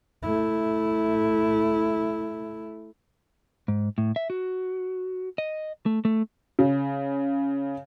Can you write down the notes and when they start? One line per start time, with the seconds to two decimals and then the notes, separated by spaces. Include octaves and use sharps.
0.23 A3 E4
3.68 G#2
3.98 A2
4.16 E5
4.30 F#4
5.38 D#5
5.86 A3
6.05 A3
6.59 C#3